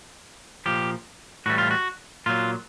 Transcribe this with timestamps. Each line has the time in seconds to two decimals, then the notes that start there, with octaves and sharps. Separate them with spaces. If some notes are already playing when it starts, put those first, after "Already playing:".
0.66 A#2 F3 G4
1.46 A2 E3 G3 F#4
1.58 F4
1.71 F#4
2.26 A#2 F#3 F4